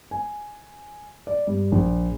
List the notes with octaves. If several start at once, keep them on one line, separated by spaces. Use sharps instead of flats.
G#5
D5
G2
A#1